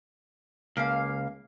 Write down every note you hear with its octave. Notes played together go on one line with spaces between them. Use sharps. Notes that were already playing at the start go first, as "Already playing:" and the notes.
C#2 A#3 F5